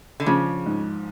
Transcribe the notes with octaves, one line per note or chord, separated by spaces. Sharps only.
D3
C#3 F3
G#2